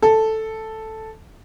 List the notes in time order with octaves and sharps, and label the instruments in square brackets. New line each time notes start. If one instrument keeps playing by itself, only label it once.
[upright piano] A4